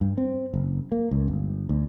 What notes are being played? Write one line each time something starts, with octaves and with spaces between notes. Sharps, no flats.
G2
C4
F#1
A#3
C#2
G1
D2